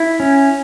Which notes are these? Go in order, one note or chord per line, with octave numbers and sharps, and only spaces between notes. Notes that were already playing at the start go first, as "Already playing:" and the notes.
Already playing: E4
C#4